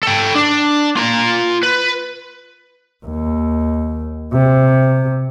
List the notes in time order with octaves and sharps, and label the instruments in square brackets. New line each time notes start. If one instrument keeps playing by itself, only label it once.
[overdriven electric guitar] A4 G5
D4
F4 A#5
B4
[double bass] D#2
C3